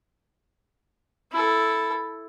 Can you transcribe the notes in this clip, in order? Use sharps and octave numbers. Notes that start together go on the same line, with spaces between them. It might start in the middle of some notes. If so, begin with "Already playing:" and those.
E4 A4